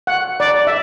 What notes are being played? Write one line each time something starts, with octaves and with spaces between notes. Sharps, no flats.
F#5
D5
E5